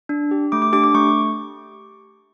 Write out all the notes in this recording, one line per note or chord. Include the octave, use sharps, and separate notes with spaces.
D4
G4
A3 D6
D6
D4 G4 D6
D6
A3 C#6